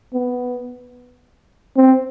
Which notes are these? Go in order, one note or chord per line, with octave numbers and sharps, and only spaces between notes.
B3
C4